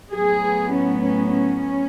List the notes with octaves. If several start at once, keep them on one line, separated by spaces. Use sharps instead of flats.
A2 F#3 B3 G#4
C#4
C#4
C#4